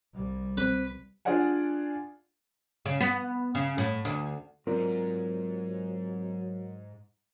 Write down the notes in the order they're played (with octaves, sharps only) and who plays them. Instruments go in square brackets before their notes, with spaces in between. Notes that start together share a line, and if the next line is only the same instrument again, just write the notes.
[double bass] C2 G3
[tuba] C4 [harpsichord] B4
[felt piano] D4 F4 G#4 D5 F#5 G#5
[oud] C#3
B3
C#3
A2
D2
[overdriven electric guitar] G#2 [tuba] F#3 [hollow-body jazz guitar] C4 F4 D5 [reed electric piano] A#4